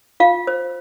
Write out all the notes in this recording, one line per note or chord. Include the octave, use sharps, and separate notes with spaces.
F4 F5
C5